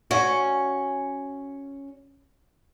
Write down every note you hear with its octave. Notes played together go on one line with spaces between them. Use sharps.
C#4 F#4